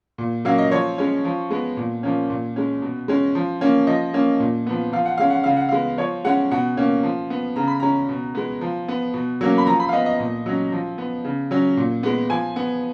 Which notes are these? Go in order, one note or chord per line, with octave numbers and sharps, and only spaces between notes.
A#2
F#3 A#3 C#4 F5
D#5
F3 C#5
G#3 C#4
F3
G#3 B3
A#2
F3 A#3 C#4
A#2
G#3 C#4
B2
G#3 C#4
F3
A#3 C#4
F3 D#5
A#3 C#4
A#2
F3 B3
F3 F5
F#5
G#3 C#4 F5
F#5
C#3 F5
F#5
G#3 B3 F5
F3 C#5
G#3 C#4 F#5
B2 F#5
A#3 C#4
F3
B3
C#3 A#5
B5
G#3 C#4 A#5
B2
G#3 B3
F3
B3
B2
F#3 A#3 C#4
B5
F3 A#5
B5
F5
B3 D#5
D#5
A#2
F#3 C#4
F3
B3
C#3
F#3 C#4
A#2
G#3 B3
F3 G#5
B3